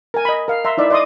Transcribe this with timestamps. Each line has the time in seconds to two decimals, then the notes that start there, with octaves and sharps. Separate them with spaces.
0.14 A#4 G#5
0.25 D#5 B5
0.48 A#4 F5
0.65 E5 A#5 C6
0.78 D#4 E4 D5 E5
0.90 D5 D#5 C6 D6 D#6